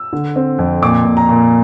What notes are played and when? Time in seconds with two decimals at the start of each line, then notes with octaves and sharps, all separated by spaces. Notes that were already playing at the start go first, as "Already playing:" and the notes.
Already playing: E6
0.13 D3
0.36 C4
0.59 F2
0.82 A#2 D6
1.05 A#2
1.17 A#5
1.29 A#2